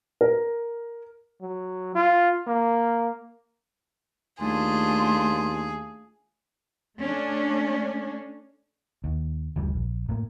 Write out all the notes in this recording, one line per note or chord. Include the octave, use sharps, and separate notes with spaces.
A#4
F#3
F4
A#3
D#2 A3 D4 F4 G#4 C6
A3 C#4 D4
D#2
F#1 D2 E3 G3
A#1
A2 A#3